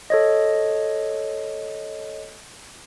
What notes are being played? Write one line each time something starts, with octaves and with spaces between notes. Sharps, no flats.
A4 C#5 D#5